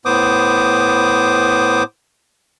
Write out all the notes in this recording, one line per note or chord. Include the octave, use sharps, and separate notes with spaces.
A2 B3 C5 D6 D#6